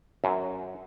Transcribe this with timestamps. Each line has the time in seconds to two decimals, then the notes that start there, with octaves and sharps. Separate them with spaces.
0.24 F#2